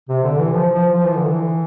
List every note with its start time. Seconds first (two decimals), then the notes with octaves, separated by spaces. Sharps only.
0.09 C3
0.23 D3
0.38 E3
0.53 F3
0.73 F3
0.93 F3
1.04 E3
1.16 D3
1.27 E3